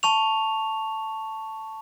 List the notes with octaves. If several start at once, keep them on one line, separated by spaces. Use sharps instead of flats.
A5 C#6 F7